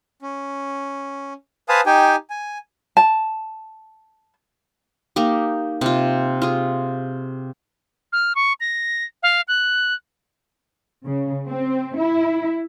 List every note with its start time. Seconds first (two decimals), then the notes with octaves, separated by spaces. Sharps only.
0.22 C#4
1.69 B4 C5 F5 G#5 A5 D#6
1.86 D#4 G4 G5 G#5
2.30 G#5
2.97 A5
5.16 A#3 D#4 G4
5.81 C3 F4
6.42 F4 G#4
8.13 F6
8.35 C#6
8.60 A#6
9.23 F5
9.48 F#6
11.04 C#3
11.47 C4
11.96 E4